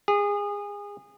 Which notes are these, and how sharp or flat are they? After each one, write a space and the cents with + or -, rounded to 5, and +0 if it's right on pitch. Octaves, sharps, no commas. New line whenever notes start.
G#4 -25